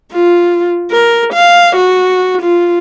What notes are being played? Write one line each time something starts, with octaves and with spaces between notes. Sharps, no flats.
F4
A#4
F5
F#4
F4